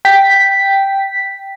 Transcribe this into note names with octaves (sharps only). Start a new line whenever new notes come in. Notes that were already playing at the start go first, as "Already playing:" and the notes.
G5 B6